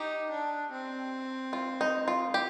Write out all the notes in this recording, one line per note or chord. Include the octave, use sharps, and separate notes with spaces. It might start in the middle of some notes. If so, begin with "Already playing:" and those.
Already playing: D#4 G4
D4
C4
F4
D#4
F4
G4